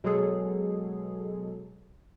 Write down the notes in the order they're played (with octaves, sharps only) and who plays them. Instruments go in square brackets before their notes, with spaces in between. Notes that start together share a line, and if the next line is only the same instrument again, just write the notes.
[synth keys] B2 F#3 G#3 G#4 A4